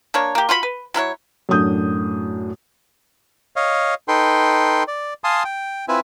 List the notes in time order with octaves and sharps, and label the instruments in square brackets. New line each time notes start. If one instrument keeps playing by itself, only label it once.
[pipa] A#3 D4 C#5
A#3 G4
F4 F#4 C5 B5
B4
F#3 E4 A#4 C#5
[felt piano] F#2 A2 D4 D#6 G6
[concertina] C#5 D#5 F5
D#4 A4 B4 G5 C6
D5
F5 G#5 A5 C6 D#6
G5
C4 E4 F4 B4 E5 G#5